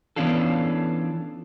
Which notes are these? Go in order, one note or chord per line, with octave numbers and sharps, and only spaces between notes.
E3 B3 C#4 D4 F4 A4